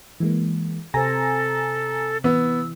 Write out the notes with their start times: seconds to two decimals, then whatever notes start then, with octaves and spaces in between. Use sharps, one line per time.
0.20 E3 G#3 A#3
0.94 C3 A4 C5 G#5 A#5 A#6
2.24 E3 B3 E6